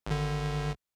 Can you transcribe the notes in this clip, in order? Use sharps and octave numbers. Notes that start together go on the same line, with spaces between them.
G#1 D3